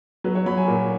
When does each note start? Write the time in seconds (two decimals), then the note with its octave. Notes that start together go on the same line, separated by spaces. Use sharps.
0.24 F#3 B4
0.35 C#5
0.46 F#3 B5
0.57 G#5
0.68 A#2